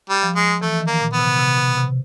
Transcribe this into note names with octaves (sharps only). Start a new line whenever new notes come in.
G3
F3
G#3
E3 A3
D#3
A#3
A#2
B3
C3
C3
B2
C3